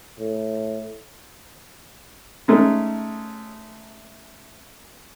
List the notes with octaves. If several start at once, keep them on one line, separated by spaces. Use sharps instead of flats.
A2
G#3 A3 C#4 D#4